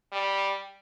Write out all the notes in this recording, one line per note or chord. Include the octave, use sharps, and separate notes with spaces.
G3